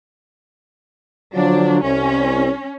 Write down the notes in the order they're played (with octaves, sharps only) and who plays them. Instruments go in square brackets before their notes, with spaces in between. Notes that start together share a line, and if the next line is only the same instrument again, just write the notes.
[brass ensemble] D3 F3 F#3 [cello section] D4
[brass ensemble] C2 [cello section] C#4